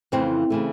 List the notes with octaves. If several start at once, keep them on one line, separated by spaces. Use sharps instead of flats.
F2 C#3 E3 A3 C4 C5
C#3 E3 A3